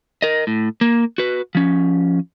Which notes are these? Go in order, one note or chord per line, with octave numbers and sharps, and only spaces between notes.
A#4 D#5
A2
A#3
F#4 B4
F3 C#4